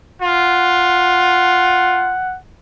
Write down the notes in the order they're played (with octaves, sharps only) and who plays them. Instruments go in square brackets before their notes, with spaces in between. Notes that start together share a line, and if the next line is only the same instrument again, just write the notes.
[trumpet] F4 [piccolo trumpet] F#5